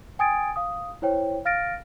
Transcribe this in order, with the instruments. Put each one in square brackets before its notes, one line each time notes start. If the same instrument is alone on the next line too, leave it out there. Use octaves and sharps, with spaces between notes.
[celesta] G5 G#5 D#6 G#6 A6 D7
F5 D#6
E4 C5 C#5 G5
F5 F6 A6 A#6 D7